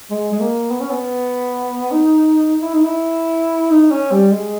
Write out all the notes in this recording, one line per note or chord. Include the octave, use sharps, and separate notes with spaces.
G#3
G#3
A#3
B3
C#4
B3
D#4
E4
D#4
E4
D#4
C#4
G3
G#3